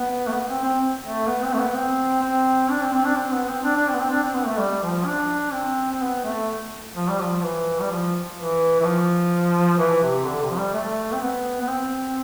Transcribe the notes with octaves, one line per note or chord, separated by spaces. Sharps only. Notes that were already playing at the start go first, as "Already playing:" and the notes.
Already playing: B3
A3
B3
C4
C4
A3
B3
C4
A3
B3
C4
C4
D4
C4
C4
D4
C4
B3
C4
D4
D4
C4
B3
C4
D4
C4
B3
A3
G3
F3
D4
C4
C4
B3
A3
F3
G3
F3
E3
G3
F3
E3
E3
F3
E3
C3
D3
C3
F3
G3
A3
C4
B3
B3
C4